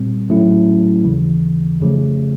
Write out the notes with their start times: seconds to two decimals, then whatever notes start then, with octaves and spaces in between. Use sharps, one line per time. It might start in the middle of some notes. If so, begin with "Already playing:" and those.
Already playing: A#2 G3 C4
0.29 A2 F#3 A3 C#4 E4
1.04 D#2 C#3 E3
1.80 F2 C#3 F3 A3